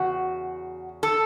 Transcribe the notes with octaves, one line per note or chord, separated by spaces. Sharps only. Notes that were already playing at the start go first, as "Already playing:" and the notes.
Already playing: E2 C#3 F#4
A4